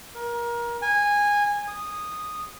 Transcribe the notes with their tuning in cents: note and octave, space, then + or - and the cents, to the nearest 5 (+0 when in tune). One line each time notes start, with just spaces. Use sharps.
A#4 +25
G#5 -15
D#6 -10